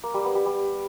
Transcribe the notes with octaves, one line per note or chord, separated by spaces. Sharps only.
A#3
G3
B3
G3
G3